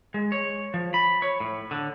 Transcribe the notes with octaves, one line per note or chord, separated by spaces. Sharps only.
G#3
C#5
F3
B5
C#5
A2
D3